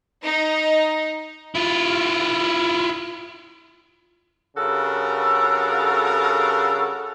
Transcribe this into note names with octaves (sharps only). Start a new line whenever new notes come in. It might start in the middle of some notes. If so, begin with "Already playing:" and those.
D#4
E4 F4
G2 C#3 F#4 A4 A#4